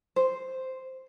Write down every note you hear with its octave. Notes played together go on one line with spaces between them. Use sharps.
C5